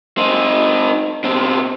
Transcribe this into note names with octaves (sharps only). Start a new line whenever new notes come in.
C4 D#4
B2 C4